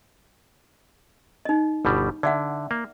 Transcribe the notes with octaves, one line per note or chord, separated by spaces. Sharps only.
D#4 D#5
G1 B2 G3
D3 D5 E5 F#5
A#3